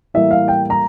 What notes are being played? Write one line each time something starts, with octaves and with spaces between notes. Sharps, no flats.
A2 E3 G3 A#3 E5
F5
G5
A#5